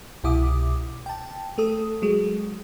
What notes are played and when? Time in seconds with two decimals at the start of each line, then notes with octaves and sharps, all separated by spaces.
0.24 C2 B2 E4 D6 D#6
1.06 G5 A5
1.58 A3 A4 D#6
2.02 F#3 G#3